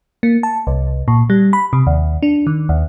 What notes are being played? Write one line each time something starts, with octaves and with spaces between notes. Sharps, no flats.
A#3
A5
C2
A#2
G3
B5
C3
D#2
D4
D#3
D#2